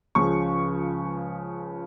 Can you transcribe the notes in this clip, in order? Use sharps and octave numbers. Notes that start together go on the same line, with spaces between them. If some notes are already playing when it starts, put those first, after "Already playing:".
C#2 C#3 F3 C#6